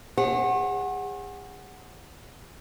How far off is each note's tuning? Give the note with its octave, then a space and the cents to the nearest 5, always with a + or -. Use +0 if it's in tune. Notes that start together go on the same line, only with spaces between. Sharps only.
G#4 -40 C#5 -45 F#5 +0